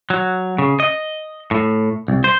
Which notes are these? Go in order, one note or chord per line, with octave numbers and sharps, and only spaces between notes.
F#3
C#3
D#5
A2
C2
C5